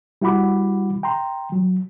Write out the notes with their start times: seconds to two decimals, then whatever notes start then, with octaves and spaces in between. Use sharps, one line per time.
0.22 G3 E4 F#4 F#5 B5 D6
1.03 G5 A#5 C6
1.52 F#3